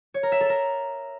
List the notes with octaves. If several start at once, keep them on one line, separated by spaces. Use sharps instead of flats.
C#5
A#4
E5
A4
A#4